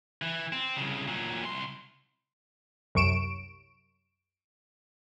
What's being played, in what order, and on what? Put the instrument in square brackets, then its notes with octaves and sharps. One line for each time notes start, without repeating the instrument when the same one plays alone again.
[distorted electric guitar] E3
C4
C2 C#3
A#2 F#3
C2 C6
[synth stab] C2 F#2 C#6 D7 E7